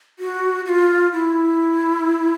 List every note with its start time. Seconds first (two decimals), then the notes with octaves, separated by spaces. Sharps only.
0.19 F#4
0.66 F#4
0.69 F4
1.13 E4